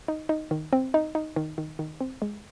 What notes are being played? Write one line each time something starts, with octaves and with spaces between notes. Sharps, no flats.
D#4
D#4
D#3
C4
D#4
D#4
D#3
D#3
D#3
C4
G#3